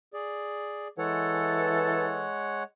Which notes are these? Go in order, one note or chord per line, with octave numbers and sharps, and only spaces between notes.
G#4 D5
E3 G#3 A4 C#5 F#5